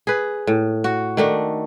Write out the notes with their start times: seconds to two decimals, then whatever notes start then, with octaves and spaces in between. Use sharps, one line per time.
0.07 G#4 B4
0.47 A2
0.84 F#4
1.17 D#3 A3 D4